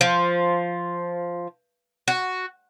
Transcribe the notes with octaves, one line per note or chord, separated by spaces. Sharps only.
F3
F#4